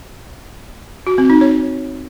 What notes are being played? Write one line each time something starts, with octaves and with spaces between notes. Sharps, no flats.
F#4
C4
D#4
C#5